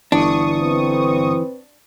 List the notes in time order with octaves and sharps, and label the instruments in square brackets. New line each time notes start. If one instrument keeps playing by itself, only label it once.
[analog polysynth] G1 C#6 D#6 [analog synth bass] E3 [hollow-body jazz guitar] D4
[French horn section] C4 B4